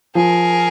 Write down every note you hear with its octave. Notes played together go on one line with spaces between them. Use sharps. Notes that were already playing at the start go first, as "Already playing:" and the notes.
F3 G#4 A#4